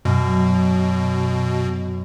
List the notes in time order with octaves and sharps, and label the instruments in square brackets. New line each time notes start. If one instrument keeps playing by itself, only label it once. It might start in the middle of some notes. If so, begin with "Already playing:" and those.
[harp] F#2 [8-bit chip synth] B2